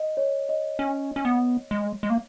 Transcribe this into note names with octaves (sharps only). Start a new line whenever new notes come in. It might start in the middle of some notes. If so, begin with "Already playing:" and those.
Already playing: D#5
C#5
D#5
C#4
C#4
B3
G#3
G#3
A#3